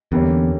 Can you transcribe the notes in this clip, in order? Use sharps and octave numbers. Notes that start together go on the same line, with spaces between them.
E2 D3 G3 A#3 C#4